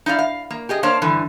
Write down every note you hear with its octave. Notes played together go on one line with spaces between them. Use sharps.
D#4 E4 D5 F5
F5
A#3
G4 G#4 D#5
A#3 D4 A#4 C5 C#5 F5
G2 D3 E3